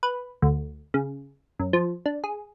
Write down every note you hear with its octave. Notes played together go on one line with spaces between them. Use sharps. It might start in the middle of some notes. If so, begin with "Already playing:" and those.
B4
D2
C#3
F#2
F3
D4
G#4